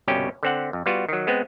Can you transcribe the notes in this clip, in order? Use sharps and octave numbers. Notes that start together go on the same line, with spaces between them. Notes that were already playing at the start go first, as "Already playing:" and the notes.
G1 C2 B2 C#4 G4 G5
D3 C4 F#5
F2
G3 B3 F4 F#4
D#3 F#3
G#3 B3 C4